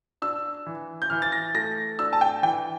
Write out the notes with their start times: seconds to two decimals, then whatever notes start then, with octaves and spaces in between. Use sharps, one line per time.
0.22 D4 E6
0.66 E3
1.02 G6
1.10 E3 F6
1.22 A6
1.32 A#6
1.55 A3 A#6
1.99 D4 E6
2.13 A5
2.21 G5
2.43 E3 G5